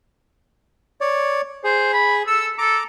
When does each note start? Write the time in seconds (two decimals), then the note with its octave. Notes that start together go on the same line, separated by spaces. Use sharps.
1.01 C#5 D5
1.64 G#4 C5
1.94 B5
2.27 A4 E6
2.58 A4 A#5 D6